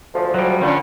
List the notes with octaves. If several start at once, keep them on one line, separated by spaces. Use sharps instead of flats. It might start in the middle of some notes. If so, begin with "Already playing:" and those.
D2 F3 G#3
F#3 G3
F2 A#2 D3 C#4